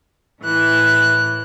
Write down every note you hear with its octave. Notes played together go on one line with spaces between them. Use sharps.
A2 E3 F#6